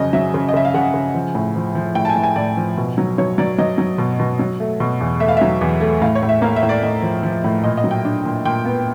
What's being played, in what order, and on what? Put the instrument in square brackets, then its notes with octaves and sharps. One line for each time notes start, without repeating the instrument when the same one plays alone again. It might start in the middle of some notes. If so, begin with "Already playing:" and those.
Already playing: [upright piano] F2 C#3 F#3 D#5
F#3 E5
C#3
D#5
C#3 E5
F5
C#3 F#5
C#3
F3
A2
F3
F3
A2 G5
A5
G#5
A2
G#5
A2 D5
F3
B2
F#3
F#3 C#5
F#3 D5
F#3 D#5
F#3
B2
B2
F#3
A3
B2
E2
A3 E5
F5
F#3 E5
E2
A3
A2 F5
C#5
A2
E5
A#3 F5
E5
A2
D5
A2 D#5
F3
F3
A2
A#2 D#5
D#5
F#3
G5
D4
A#2
A#2 G5
B3